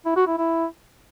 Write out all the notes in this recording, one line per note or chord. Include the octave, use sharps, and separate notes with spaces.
E4
F#4
E4
E4